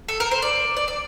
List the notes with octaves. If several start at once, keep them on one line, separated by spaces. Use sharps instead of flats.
A4
A#4
C5
D5
D5
D5